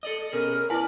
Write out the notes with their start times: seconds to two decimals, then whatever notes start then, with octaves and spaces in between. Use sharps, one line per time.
0.03 A4 D5 D#5
0.33 B2 C#4 G#4 A#4
0.70 E4 B4 D5 G#5